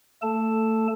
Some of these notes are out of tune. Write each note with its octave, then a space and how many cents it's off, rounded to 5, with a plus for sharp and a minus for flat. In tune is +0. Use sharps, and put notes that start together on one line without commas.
A3 +25 A4 +0 A5 +0